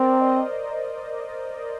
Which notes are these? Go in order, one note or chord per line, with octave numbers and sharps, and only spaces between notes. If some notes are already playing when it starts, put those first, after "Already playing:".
Already playing: C4 A#4 D5
C5 D#5